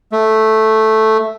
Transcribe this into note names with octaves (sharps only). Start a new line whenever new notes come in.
A3